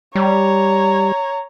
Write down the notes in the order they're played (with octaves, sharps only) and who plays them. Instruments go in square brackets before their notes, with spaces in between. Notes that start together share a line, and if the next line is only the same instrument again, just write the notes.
[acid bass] G3 [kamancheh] C#5 A#5